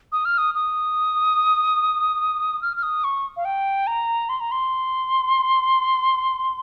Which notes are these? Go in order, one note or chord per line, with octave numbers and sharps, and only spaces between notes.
D#6
F6
D#6
D#6
F6
F6
D#6
C#6
F5
G5
A#5
C6
A#5
C6